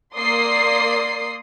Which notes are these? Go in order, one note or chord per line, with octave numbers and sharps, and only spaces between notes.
A#3 D5 C6 D#6 C7